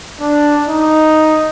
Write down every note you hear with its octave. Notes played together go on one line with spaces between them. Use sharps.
D4
D#4